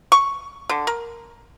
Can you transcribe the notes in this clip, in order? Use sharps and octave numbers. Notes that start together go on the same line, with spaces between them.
C#6
D3
A#4